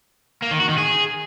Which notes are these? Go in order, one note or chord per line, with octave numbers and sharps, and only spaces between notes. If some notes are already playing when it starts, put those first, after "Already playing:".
A#3
D#3
F#4
D#3
G#4